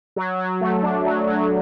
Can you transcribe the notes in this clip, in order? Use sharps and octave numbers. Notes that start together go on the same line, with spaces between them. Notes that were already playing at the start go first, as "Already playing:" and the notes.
F#3
F#3
A3
D4
F#3
F#3